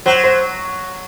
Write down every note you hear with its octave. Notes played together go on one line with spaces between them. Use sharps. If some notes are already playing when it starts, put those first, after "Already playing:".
F#3 C5
C5